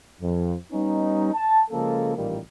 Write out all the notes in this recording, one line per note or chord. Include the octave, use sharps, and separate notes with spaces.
F2
G3 B3 C#4 D#4
A5
C#3 F3 G#3 A#3 C#4 A4
A1 A#2 D#3 G3 A#3